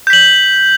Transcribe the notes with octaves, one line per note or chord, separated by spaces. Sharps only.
G6 B6 F#7